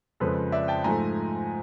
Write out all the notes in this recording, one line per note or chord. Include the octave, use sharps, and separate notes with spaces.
F2 C#3 F3 G#3 A4 B4
D5 E5
G5 A5
G#2 F3 A3 G#5 A#5